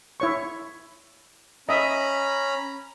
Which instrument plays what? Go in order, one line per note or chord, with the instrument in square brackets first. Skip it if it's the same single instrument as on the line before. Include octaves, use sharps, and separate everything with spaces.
[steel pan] E4 C#5 C#6
[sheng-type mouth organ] C#4 A#5 B5 [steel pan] D#5 E5